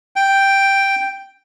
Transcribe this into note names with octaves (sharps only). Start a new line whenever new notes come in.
G5